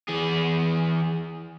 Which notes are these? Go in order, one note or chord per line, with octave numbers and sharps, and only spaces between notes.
E3 G#4